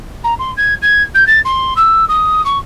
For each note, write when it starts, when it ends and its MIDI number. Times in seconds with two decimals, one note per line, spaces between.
0.24 0.34 82
0.39 0.51 84
0.57 0.74 92
0.82 1.02 92
1.14 1.26 91
1.27 1.39 93
1.45 1.73 84
1.76 2.04 88
2.08 2.42 87
2.45 2.58 85